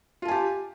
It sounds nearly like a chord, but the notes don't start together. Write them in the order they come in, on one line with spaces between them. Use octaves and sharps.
F4 A5 G#5 G4